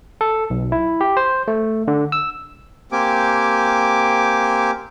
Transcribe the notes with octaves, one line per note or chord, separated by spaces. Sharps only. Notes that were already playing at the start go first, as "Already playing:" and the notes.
A4
B1
E4
G4
C5
A3
D3
E6
A#3 C4 G4 G#5 D6